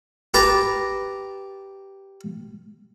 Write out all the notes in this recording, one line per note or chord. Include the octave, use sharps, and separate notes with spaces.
G4 B4 A5 A#5